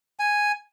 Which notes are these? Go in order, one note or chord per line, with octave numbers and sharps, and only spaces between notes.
G#5